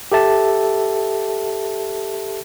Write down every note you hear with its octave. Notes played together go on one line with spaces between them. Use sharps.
G4 A4 E5 A5